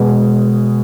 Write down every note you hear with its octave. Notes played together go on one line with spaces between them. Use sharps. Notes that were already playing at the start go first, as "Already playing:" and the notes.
Already playing: B2 G#3